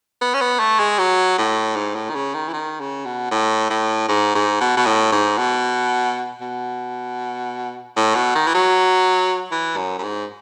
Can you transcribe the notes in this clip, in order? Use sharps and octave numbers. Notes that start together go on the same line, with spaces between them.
B3
C#4
B3
A3
G#3
F#3
A2
G#2
A2
D#3
C#3
D#3
E3
D#3
C#3
B2
A2
A2
G#2
G#2
B2
B2
A2
G#2
B2
B2
A2
B2
D#3
E3
F#3
E3
F#2
F#2
G#2